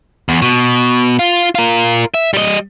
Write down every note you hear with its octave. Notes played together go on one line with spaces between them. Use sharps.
E2
B2
F4
F4 A#4
E5
G3 D#5